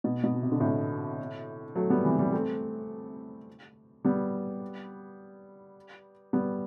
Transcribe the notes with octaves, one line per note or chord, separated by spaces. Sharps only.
B2
B2
C3
D3
A2 C3
F#3 A3
G3 B3
C3 E3
E3 G3
A3 C4
G3 B3
G3 B3